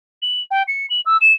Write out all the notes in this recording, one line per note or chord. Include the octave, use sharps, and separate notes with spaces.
F#7
G5
C#7
F#7
E6
E7